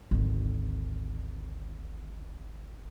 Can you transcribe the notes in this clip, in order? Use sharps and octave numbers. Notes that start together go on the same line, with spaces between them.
G#1 D2